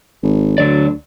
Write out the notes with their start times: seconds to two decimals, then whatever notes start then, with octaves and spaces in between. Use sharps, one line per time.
0.23 G#1
0.58 D2 D3 F#3 D5